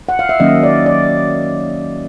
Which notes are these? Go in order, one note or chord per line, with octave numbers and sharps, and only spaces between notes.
F#5
F5
E5
D#3 F#3 A#3 C#4 D#5
D5
D5